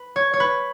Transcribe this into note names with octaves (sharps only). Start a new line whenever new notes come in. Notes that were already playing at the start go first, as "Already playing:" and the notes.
Already playing: B4
C#5
C#5
B4